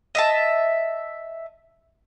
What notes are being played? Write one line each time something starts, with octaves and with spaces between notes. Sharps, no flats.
D#5 E5 A5